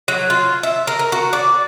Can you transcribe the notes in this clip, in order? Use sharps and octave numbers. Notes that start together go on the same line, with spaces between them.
F#3
F4
E5
A#4
A#4
F#4
D5